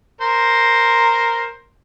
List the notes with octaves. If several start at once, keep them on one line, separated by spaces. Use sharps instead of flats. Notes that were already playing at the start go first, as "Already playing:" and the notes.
A#4 C5